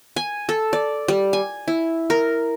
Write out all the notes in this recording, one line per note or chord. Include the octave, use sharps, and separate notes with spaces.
G#5
A4
D5
G3
G#5
E4
A#4